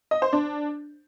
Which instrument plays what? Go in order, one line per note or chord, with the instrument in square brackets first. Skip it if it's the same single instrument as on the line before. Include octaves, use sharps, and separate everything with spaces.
[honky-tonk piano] D#5
C5
D4